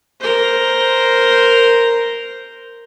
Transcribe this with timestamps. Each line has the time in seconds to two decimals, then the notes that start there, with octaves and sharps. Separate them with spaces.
0.20 A#4 C5